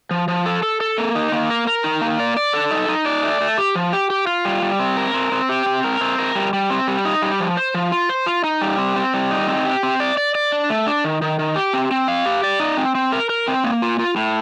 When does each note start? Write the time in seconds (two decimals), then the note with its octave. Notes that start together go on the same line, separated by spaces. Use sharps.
0.11 F3
0.28 F3
0.46 A4
0.63 A4
0.81 A4
0.98 A#3
1.15 D#4
1.32 A#3
1.50 A#4
1.67 A#4
1.84 D#4
2.01 A#3
2.20 D5
2.37 D5
2.53 A4
2.71 D#4
2.89 D#4
3.06 D5
3.23 A3
3.41 A3
3.58 G4
3.75 F3
3.93 G4
4.10 G4
4.27 F4
4.45 G3
4.62 G3
4.79 C4
4.97 A#4
5.14 C4
5.32 C4
5.49 G4
5.66 C4
5.84 A#4
6.01 C4
6.18 A#4
6.35 G3
6.53 G3
6.70 C4
6.88 G3
7.05 D#4
7.22 G3
7.40 F3
7.57 C5
7.75 F3
7.92 F4
8.09 C5
8.26 F4
8.44 D#4
8.61 G3
8.78 C4
8.96 C4
9.14 G3
9.31 D#4
9.48 C4
9.66 G4
9.83 C4
10.00 D5
10.17 D5
10.35 D5
10.52 D4
10.70 A3
10.87 D4
11.04 D#3
11.22 D#3
11.39 D#3
11.56 G4
11.73 C4
11.91 C4
12.08 F5
12.26 G4
12.44 D5
12.60 D#4
12.77 C4
12.95 C4
13.12 A#4
13.30 A#4
13.48 C4
13.64 A#3
13.82 F4
13.99 F4
14.16 A2